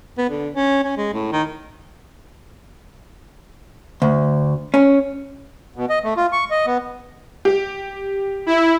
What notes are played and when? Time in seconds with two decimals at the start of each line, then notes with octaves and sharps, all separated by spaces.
0.18 B3
0.29 D3
0.54 C#4
0.84 C#4
0.97 G#3
1.13 A2
1.32 D#3
4.02 D2
4.74 C#4
5.76 B2
5.90 D#5
6.04 A3
6.17 F4
6.33 C#6
6.51 D#5
6.67 B3
7.45 G4
8.46 E4